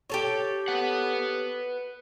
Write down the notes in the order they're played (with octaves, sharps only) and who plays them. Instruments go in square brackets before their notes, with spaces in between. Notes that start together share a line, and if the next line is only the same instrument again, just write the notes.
[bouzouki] G4 A4 C#5
[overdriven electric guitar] B4 F#5